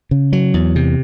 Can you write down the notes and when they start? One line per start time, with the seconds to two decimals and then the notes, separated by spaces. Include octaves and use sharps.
0.11 C#3
0.33 F#3
0.54 E2
0.76 C3